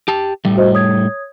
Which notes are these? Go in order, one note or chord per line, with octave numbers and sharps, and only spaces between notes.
G4 A5
A2 G3 A3
F#4 C5 D#5
C#5 D#6 G#6